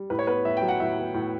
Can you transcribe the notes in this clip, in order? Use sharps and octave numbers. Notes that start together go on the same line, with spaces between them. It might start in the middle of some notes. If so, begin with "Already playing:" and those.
Already playing: G3
A2 B4
C#5
B3 B4
A2 E5
G5
F#3
F#5
A2 E5
B3
A2